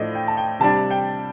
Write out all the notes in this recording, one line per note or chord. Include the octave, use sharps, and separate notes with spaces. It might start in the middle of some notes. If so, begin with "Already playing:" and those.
Already playing: A2 F3 A3 D4 D#5
G5
A5
G5
C3 G3 D4 A5
G5